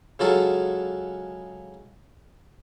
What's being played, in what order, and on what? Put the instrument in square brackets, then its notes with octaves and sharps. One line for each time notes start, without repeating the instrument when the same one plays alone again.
[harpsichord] C#3 F#3 G#3 F4 F#4 A4